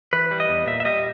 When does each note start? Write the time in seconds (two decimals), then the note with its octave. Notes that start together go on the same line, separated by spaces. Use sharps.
0.13 E3 B4
0.31 G3
0.40 D#5
0.49 E2
0.67 A#2 E5
0.80 E5
0.85 G3 D#5